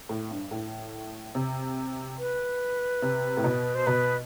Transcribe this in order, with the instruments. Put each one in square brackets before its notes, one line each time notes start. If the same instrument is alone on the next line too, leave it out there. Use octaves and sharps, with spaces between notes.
[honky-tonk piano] A2
G2
A2
C3
[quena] B4
[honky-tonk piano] C3
A2
B2
[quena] C5
[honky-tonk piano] B2 [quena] B4